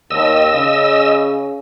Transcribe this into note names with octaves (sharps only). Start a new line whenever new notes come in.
D#2 D#5 E6
C#3